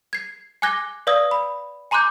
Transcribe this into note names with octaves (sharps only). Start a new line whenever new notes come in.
G#6 C7
G#5 D6 F#6 G#6 A#6 G7
B4 D5 F5 D#6 E6 G#6
B5
G#5 A#5 C6 D6 F#6 G6